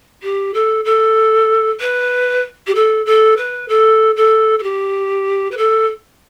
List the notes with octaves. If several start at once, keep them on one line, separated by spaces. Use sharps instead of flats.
G4
A4
A4
B4
G4
A4
A4
B4
A4
A4
A4
G4
B4
A4